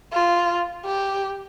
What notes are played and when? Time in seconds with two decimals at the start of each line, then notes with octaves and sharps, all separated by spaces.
0.13 F4
0.85 G4